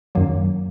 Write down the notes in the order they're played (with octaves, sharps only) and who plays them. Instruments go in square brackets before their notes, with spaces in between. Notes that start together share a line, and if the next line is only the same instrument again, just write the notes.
[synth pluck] F#2 D#3 F#3 A#3